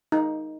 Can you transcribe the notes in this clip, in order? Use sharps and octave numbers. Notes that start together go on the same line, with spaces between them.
D#4